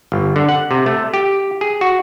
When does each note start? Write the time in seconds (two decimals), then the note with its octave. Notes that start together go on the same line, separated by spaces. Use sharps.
0.12 G1
0.36 D3
0.49 F#5
0.71 C3
0.86 A3
1.14 G4
1.61 G#4
1.81 F#4